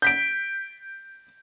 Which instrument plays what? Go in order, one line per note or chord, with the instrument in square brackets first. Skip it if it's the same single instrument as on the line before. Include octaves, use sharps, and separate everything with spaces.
[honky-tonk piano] G6 B6 D7